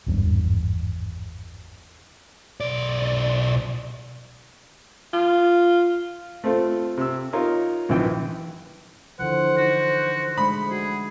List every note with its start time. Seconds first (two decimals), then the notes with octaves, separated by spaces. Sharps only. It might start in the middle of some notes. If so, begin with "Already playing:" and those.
0.07 G#1 E2 G2
2.60 B1 D5
5.13 F4
6.44 A3 C4 F4 A4
6.97 C3 E6
7.33 D#4 F4 A#4 C#5 D#5
7.89 A#1 F#2 D#3 E3 G5
9.19 D3 E3 F3 C5 F#5
9.57 D#4 F#4
10.37 G#3 A3 D4 B5
10.71 F#4 G#4